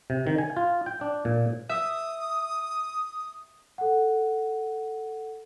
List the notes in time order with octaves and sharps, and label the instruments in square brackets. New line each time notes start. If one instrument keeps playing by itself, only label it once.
[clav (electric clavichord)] C3
D#3
G#5
F4
G5
D4
A#2
[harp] E5 [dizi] D#6
[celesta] A4 F#5